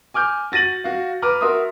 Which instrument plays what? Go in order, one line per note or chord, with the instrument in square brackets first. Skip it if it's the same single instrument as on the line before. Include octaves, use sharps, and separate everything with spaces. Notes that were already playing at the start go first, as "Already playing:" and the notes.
[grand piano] G#5 D6 F6 G6
F#4 A6 A#6 D#7 F#7
F#4 F5
B4 A#5 D6 F6
F#4 A#4 E5 C6 D#6